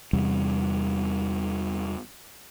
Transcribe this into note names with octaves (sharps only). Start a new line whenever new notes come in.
E2 C3 G3